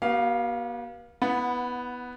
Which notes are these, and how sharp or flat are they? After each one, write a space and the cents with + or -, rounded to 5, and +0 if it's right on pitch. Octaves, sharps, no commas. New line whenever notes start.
B3 -45 G4 -45 F5 +0
B3 +0 E4 -25 F#5 -15